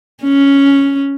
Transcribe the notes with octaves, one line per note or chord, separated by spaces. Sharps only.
C#4